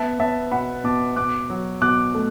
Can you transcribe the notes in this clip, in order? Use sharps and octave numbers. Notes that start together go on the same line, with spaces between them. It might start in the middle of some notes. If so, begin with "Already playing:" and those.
Already playing: B3 E5 A5
B3 E5 A5
B2 F#5 B5
B2 A5 D6
B2 D6 F#6
F#3
B2 D6 F#6
A3